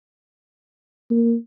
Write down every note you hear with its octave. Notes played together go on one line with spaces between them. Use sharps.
A#3